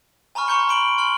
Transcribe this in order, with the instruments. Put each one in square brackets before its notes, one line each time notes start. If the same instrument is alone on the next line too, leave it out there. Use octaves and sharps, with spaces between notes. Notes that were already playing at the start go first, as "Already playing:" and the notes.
[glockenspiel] G#5 A#5 B5 C#6 F6
A#5 C6 C#6 G6 C#7 G7
B5 C6 D7 F#7 G7
G#5 C6 F6 F#7 G7